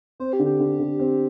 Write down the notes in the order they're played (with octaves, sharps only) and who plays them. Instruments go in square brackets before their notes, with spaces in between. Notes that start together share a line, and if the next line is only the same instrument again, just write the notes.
[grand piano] C4 [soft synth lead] C5
[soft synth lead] G4
[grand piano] D3
[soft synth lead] G4
[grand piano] D3
D3
C4